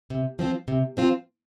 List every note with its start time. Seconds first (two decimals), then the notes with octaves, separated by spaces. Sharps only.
0.10 C3
0.39 F3 C4 F4
0.68 C3
0.97 F3 C4 F4